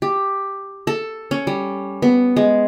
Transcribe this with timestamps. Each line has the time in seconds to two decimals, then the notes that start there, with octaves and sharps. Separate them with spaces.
0.02 G4
0.87 A4
1.31 C#4
1.47 G3
2.02 B3
2.36 G#3